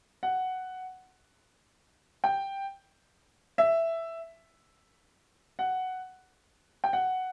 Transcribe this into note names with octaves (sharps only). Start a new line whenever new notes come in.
F#5
G5
E5
F#5
G5
F#5